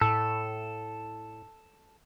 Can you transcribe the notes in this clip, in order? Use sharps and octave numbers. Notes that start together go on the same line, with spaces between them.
A2 A4